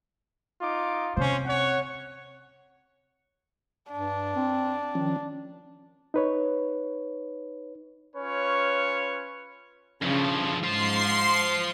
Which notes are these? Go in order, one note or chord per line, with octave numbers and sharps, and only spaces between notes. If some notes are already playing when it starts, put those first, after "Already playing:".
D#4 F4 D6
C3 C#4 C5
C#5 F#5
G2 D4
C4
D#3 F3 C#4
D#4 B4 C#5
C#4 F4 B4 C#5
G2 C#3 F3
G#2 F4 C5 C6 C7